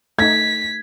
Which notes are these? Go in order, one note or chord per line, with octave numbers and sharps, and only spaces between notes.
A3 D#4 G#6 B6